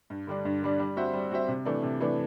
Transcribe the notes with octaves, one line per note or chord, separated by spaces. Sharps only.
G2
D3 G3 D4
G2
D3 G3 D4
G3
C4 F#4 C5 E5
G3
C4 F#4 C5 E5
C3
E3 A3 D4
C3
E3 A3 D4